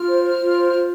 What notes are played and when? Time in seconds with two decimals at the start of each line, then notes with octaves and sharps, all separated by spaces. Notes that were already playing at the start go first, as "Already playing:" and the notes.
Already playing: F4 F6
0.09 C5
0.24 C5
0.40 F4
0.56 C5
0.72 F4